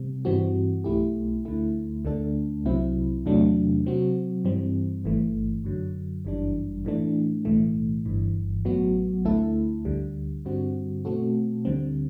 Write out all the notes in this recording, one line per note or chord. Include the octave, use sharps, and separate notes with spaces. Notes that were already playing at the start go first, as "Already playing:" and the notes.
Already playing: C3 G3 C4
G2 E3 G3 C4 F#4
B1 B2 A3 E4 G4
D2 D3 A3 E4
D2 D3 A3 D4 A4
C2 C3 F#3 C4 E4
E2 C3 F#3 A3 D4
C3 F#3 C4 F#4
G2 E3 G3 C4
G1 G2 E3 A3
F#2 D3 F#3
G1 F#2 E3 G3 D4
A2 E3 A3 D4
B1 A2 E3 A3
G1 G2 E3
A1 A2 F#3 B3 F#4
D2 D3 A3 E4 A4
D2 D3 G3
G2 D3 G3 C4 F#4
B2 A3 C4 F#4 A4
D2 D3 G3 C4